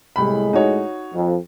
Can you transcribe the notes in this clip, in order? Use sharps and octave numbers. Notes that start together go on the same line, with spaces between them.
C2 A2 G#3 B5
D#4 F#4 C#5
F2